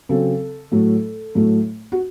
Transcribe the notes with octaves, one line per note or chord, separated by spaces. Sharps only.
C#3 F#3 C4 A4
A2 F#3 A3
A2 F#3 A3
F#4